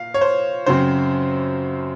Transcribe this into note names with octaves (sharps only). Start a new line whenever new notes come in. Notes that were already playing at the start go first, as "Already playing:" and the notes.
Already playing: A#2 A#3 F5
C#5
C5
F#2 C#3 F#3 C4 C5